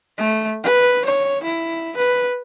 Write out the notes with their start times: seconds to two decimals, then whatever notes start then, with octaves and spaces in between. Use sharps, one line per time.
0.17 A3
0.64 B4
1.05 C#5
1.43 E4
1.97 B4